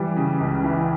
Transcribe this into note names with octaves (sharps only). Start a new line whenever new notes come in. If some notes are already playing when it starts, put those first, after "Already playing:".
Already playing: E3 G3
C#3
C#2
E3